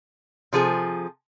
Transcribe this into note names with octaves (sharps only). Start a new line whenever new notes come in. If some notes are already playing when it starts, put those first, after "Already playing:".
C3 F3 G#4 A4